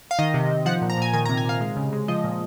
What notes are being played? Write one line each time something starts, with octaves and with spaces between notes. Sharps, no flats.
F5
D#3 D#5
C3
C3
F3 F#5
A#2
A#5
A#2 G#5
D#3 G#5
A#5
C3
G#5
C3 F5
G#3
C#3
G#3
F3 D#5
A#2